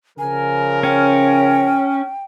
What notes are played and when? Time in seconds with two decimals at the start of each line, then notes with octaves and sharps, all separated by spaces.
0.18 C#3 F3 A#4 G#5
0.83 C#4 G5